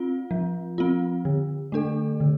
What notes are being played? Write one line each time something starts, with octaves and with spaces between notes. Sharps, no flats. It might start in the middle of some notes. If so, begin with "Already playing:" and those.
Already playing: C4 F4
F3
C4 F4
D3
A3 D4 A4
D3